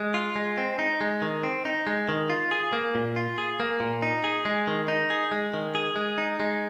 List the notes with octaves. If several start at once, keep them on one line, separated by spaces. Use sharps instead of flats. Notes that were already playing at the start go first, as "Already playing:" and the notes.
Already playing: G#3
F4
G#3
C4
D#4
G#3
D#3
C4
D#4
G#3
D#3
F4
G#4
A#3
A#2
F4
G#4
A#3
A#2
D#4
G#4
G#3
D#3
D#4
G#4
G#3
D#3
G#4
G#3
D#4
G#3